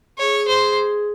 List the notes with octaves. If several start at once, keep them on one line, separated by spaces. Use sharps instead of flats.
G#4 C#5
C5